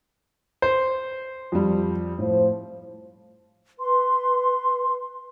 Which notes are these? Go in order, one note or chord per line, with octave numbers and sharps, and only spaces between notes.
C5
F2 G3
A2 F3 C5
B4 C6